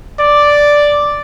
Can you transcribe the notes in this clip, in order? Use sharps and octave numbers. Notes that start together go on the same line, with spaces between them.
D5